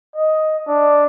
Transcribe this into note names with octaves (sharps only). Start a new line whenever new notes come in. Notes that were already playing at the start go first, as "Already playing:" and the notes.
D#5
D4